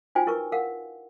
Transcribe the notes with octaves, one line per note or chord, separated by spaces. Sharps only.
D#4 F4 F#4 C5 G5 G#5
E4 A#4 B4 C#6
A#4 F5 F#5